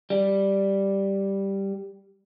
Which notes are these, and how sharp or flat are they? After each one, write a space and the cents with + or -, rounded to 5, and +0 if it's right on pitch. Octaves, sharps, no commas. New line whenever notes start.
G3 +0